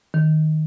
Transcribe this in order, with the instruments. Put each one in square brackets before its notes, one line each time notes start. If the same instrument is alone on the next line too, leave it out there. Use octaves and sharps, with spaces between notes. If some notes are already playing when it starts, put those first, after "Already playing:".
[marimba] D#3